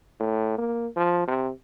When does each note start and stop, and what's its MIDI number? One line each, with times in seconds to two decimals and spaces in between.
0.20 0.57 45
0.58 0.87 58
0.96 1.25 53
1.28 1.51 48